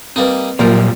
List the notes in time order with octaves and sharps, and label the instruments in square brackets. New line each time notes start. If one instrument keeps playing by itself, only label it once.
[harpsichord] G3 A#3 D#4 [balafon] C4 B4
[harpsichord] F#2 [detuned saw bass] A#2 [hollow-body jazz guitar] F3 G3 A#4 [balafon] A#3